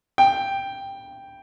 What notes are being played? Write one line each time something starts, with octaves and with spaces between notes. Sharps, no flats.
G5